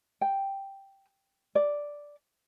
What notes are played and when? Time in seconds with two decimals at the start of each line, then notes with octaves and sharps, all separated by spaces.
0.21 G5
1.55 D5